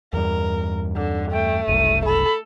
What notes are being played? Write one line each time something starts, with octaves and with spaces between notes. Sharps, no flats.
E2 G2 A#4
D3
A3 G5
F#1 C2 D#7
A4 B5